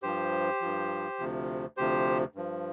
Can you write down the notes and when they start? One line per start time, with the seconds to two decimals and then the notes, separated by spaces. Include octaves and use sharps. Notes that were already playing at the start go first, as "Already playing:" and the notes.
0.02 G2 F3 G4 C5
0.61 G2 F3
1.19 D2 C3 F3
1.77 D2 C3 F3 G4 C5
2.35 G2 F3